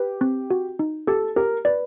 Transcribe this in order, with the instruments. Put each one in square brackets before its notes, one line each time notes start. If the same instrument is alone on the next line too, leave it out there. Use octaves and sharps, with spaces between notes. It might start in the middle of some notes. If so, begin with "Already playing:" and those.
Already playing: [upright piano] G4 [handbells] B4
[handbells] C4
F#4
D#4
[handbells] G4 [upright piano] A4
[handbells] G4 [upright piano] A#4
[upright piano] B4 [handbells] D5